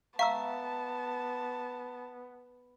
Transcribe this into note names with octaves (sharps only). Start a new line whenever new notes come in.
B3 E5 F5 A5 A#5 C#6 E6